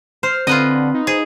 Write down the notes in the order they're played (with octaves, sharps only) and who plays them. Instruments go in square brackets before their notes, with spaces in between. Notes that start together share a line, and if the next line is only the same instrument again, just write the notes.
[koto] C5 [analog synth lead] F6
[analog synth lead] D3 [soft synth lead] C4 [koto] F4 B4 D#5
[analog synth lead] D#4
[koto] G#4 [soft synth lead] C5